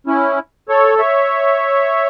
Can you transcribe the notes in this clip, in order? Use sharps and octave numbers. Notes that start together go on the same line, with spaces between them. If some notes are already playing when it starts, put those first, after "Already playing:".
C#4 E4
A4 C#5
C#5 E5